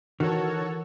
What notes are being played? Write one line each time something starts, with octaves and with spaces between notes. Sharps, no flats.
D#3 E3 F#4 A4 A#4 C#5